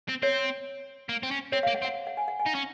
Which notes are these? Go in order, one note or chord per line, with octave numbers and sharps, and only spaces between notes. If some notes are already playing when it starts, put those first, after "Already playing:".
C4
C4 C#5
A#3
C4
C#4
C4 C#5
A#3 F5
F#5
C4
F#5
F#5
G#5
F#5
G#5
D#4
C#4